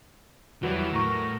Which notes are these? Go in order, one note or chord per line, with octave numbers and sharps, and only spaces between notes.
E2 E3 F#3 G3 F#4 B4 B5
A2 A#4 A#5 C#6 A#6